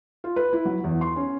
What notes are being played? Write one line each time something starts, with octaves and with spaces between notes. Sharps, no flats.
F4
B4
E4
F#3
E2
C6
C#4